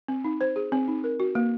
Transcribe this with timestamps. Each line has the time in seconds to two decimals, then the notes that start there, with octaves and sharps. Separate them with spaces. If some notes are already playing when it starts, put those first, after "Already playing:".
0.08 C4
0.24 D#4
0.41 C5
0.56 G#4
0.72 C4
0.88 D#4
1.04 A#4
1.20 F#4
1.35 A#3